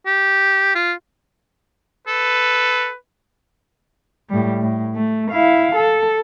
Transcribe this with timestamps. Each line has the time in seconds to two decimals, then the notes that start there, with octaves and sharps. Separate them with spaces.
0.06 G4
0.75 F4
2.07 A4 B4
4.29 A2 G3
4.62 A2
4.95 A3
5.31 E4 F5
5.76 A4